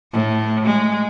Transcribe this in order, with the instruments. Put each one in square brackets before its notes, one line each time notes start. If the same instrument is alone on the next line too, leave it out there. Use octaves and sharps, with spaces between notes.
[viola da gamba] A2
G#3